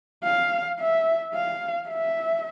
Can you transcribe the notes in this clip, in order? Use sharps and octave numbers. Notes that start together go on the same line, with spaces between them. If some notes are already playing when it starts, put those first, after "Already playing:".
F5
E5
F5
E5